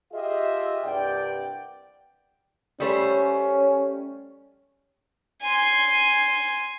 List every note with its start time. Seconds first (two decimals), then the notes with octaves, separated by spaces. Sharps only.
0.13 F4 G4 G#4 D#5 E5
0.84 C2 G2 D5 F#5 G5
2.80 G3 A3 C#4 C5
5.43 G#5 C6